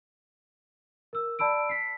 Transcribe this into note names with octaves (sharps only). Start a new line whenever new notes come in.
A#4 E6
D5 A5 B5 E6 D7
B6 C7